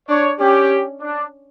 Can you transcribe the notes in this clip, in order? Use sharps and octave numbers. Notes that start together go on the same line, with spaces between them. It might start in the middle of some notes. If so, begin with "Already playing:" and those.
D4 C#5
C#4 G4
D4